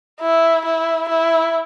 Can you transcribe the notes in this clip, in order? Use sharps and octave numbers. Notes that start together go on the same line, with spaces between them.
E4
E4
E4